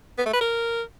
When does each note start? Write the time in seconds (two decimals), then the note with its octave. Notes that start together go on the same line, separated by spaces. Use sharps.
0.18 B3
0.26 A3
0.33 B4
0.41 A#4